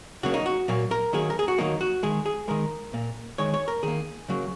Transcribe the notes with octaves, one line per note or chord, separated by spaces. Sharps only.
C#3 F#3 A#3 F#4
D#4
F#4
A#2 F#3 A#3
A#4
D#3 F#3 A#3 G#4
A#4
G#4
F#4
D#3 F#3 A#3 D#4
F#4
D#3 G#3 G#4
G#4
D#3 G#3 A#4
A#2 A#3
D#3 G#3 C#5
C#5
A#4
D#3 A#3 G#4
C#3 F#3 A#3